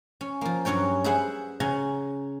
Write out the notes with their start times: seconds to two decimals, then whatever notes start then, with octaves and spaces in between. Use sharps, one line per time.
0.21 C#4
0.41 F3 A#3
0.65 G2 F#3 C#4 C#5 G5
1.04 G#4 B4 C5 E5 F#5
1.60 C#3 F#4 G#5 A#5